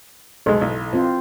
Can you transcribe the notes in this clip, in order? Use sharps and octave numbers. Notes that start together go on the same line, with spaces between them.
B1 G#3 A4
B1 E4
C4 F4 C5